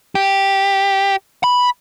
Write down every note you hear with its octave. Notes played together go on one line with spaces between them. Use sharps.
G4
B5